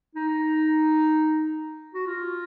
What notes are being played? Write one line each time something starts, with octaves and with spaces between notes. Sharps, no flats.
D#4
F#4
F4